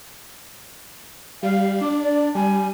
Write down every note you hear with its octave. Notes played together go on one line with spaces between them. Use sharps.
G3 F5
D4 D6
D5
G3 G#5